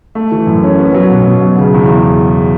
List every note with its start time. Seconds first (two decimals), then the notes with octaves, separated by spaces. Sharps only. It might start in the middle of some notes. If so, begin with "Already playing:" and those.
0.15 A3
0.32 E3
0.47 F#2
0.63 C#4
0.79 B3
0.94 F#3
1.11 B2
1.26 B2
1.42 F#3
1.58 C#3
1.74 E2